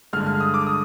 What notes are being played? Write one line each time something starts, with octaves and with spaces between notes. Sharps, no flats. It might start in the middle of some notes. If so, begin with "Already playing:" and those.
G2 D3 G#3 F6
F6
D#6
D6
D#6